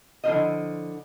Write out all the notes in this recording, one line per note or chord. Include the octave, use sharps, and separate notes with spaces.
D3 F3 E4 F4 C5 D#5